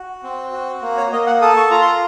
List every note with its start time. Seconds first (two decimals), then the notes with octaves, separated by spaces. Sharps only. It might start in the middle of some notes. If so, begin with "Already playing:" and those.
Already playing: F#4
0.23 C4
0.52 F#4
0.82 A#3
0.97 C#5
1.12 A#3 D#5
1.27 F#5
1.41 A4 D#6
1.57 C#6
1.71 F4 A#5
1.82 C6
1.86 A#5